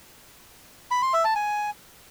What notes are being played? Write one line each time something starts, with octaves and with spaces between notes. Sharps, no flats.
B5
C6
E5
A5
G#5